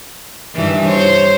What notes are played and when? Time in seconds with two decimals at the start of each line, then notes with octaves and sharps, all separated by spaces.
0.55 G2 D#3 E3
0.86 C5 C#5